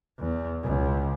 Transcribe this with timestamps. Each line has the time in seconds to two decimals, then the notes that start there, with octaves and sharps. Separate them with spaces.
0.19 E2
0.63 C#2